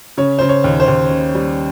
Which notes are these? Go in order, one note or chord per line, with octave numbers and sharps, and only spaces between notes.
C#3 C#5
C#3 C5
C#5
D#2
C5
D#2
C#3
G3